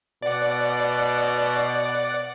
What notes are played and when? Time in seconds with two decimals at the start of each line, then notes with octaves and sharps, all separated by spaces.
0.23 B2 D5 F#5